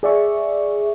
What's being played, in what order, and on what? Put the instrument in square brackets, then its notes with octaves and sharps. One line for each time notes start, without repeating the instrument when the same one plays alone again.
[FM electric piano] G#4 D5 E5 C#6